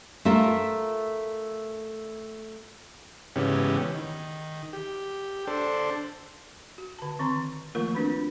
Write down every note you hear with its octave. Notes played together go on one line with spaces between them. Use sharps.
A3 F4 A4 A#4
G#2 C#3 E3 B3 C#4 G4
D#3
G4
D4 A4 C5
F#4
D3 A5
D#3 C4 A#5 C6
D#3 F3 A3 A#3 F4 A#4
C4 D4 F#4 A#4 B4 B5